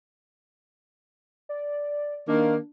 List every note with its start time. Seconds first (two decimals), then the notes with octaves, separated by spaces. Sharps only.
1.49 D5
2.28 D#3 A#3 D4